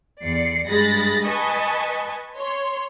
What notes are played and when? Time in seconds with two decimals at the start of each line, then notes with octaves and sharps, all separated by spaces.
0.24 E2 D5 C7 C#7
0.68 G2 G#3 B5 A6 A#6
1.26 B4 D#5 G#5 A5 C#6
2.38 C#5 C6